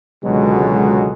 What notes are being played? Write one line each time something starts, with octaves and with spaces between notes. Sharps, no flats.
C#2 B2 D3 F#3 G#3